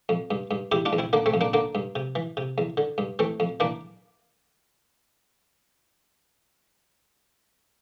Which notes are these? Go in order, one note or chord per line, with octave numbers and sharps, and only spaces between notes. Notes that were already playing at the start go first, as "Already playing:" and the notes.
F2
G2
G2
E2 E4 G4
D4 F4
E2
C4 E4
D3 A#3 D4
A3 C4
F2
A#3 D4
D3 A#3 D4
G2
C3
E3
C3
E2
D3
G2
E3 A3 C4
F2
E3 A#3 D4